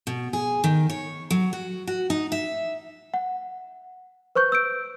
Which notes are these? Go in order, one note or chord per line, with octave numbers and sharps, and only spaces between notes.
B2
G#4
D#3
C#5
F#3
F#4
F#4
D#4
E5
F#5
B4 C5 C#6 G6
E6 G6 D7